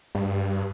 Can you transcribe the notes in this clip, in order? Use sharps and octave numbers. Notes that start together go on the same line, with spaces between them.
G2